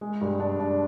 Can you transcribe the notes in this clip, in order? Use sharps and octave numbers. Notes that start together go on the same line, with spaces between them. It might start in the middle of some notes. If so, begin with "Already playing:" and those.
G#3
G2
D4
D4